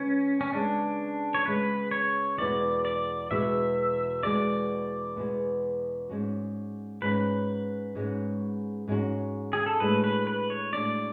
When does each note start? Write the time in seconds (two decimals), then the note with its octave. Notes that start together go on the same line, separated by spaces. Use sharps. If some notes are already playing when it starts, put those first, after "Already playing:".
Already playing: C#3 G#3 B3 C#4
0.41 C#4
0.53 C#3 G#3 B3 D4
1.34 C#5
1.46 C#3 G#3 B3 B4
1.91 C#5
2.38 E2 B2 G#3 B3 F#4 D5
2.85 D5
3.31 E2 B2 G#3 B3 F#4 E5
4.23 E2 B2 G#3 B3 F#4 D5
5.16 E2 B2 G#3 B3 F#4
6.09 G#2 G#3 C#4 F#4
7.02 G#2 G#3 C#4 F#4 B4
7.95 G#2 G#3 C#4 F#4
8.88 G#2 G#3 C#4 F#4
9.53 G#4
9.66 A4
9.80 A2 G#3 D4 F#4 B4
10.04 B4
10.27 B4
10.50 C#5
10.73 A2 G#3 D4 F#4 D5